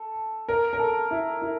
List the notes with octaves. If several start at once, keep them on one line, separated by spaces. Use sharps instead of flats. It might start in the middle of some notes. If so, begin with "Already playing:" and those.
Already playing: A4
A#4
A#4
A4
E4
E4